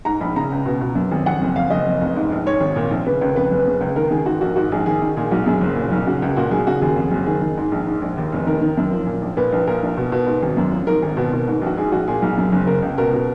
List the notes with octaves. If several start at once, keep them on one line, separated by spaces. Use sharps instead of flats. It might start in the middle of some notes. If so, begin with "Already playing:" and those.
G#2 A#5
A#1 B5
C#3 A#5
C#2
B2
B2
F#2
G#1
F2 F#5
F#1
F2 F5
F#1 D#5
F2
F1
G#2
A#1
G#2 C#5
G#1
A#2
A#1
C#3 B4
C#2
F2 B4
F#1
C#3
C#2
D#3 A#4
D#3 G#4
G#2 F#4
A#1 F#4
G#2 F#4
A#1 G#4
D#3 G#4
D#3
A#2 G#4
B1 F#4
F#2 G#4
F#1
A#2
B1
C#3 F#4
C#2
A#2 F#4
B1 G#4
C#3 F#4
D#2 G#4
F2
F#1
D#3 G#4
D#3
G#2
A#1
G#2
A#1
D#2
F1
D#3 A#4
D#3
F#2
F3
A#2
A#1
A#2 B4
A#1
A#2 A#4
A#1
B2
B2
G#2
G#1
F#2
F3
G#2 A#4
G#1
B2
B2
G#2
A#1 F#4
G#2 G#4
A#1 F#4
A#2 G#4
B1
F#2
F#1
C#3 A#4
C#2
B2 A#4
B2